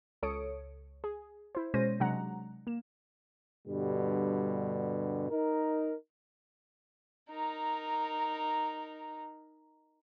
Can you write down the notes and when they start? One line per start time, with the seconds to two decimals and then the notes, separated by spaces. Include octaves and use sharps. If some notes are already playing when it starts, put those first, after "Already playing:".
0.22 C#2 A4 C#5 D#6 C#7 D7
1.04 G#4
1.55 E4 C5
1.74 B2 G#3 C#4 C5 A#6 D#7
2.00 C3 F#3 G#3 D4 F#5 A#5
2.67 A#3 E7
3.68 G2 B2 D3 G3
5.30 D#4 A#4
7.30 D#4 A#4